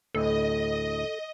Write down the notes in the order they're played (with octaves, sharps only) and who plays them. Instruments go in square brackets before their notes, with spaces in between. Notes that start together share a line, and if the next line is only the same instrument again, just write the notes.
[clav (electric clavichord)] D2 A2 [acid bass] A4 [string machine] D#5